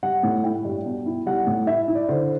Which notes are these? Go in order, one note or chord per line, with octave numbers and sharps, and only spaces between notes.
G3 F#5
A2
E4 G5
G2
B2
E4
G3 F#5
A2
E4 E5
E4
D5
D3 C5